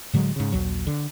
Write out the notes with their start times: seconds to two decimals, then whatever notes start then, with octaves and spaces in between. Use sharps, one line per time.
0.13 A2 D3 F#3 G#3
0.36 G#2 C#3
0.52 A#1 D#2 F#3
0.87 D3